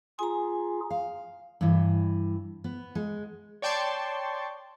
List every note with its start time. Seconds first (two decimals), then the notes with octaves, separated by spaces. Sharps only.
0.19 F4 G#4 G#5 A#5
0.90 F5
1.61 G2 E3
2.64 B3
2.95 G#3
3.62 C#5 D5 G5 A5 C6 C#6